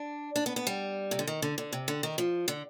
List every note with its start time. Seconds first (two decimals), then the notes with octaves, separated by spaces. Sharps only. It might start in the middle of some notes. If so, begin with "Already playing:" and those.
Already playing: D4
0.36 D4
0.46 B3
0.56 B3
0.67 G3
1.11 C3
1.19 D3
1.27 D#3
1.42 D3
1.58 D3
1.72 C3
1.88 D3
2.03 D#3
2.18 F3
2.48 D3